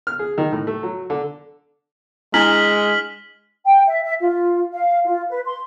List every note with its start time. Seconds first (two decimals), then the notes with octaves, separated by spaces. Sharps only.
0.07 F6
0.19 G#4
0.38 D#3
0.52 A2
0.67 A3
0.83 F#3
1.10 D3
2.34 G#3 D4 E4 F6 B6 F#7
3.66 G5
3.87 E5
4.04 E5
4.21 F4
4.73 F5
5.05 F4
5.30 B4
5.45 C6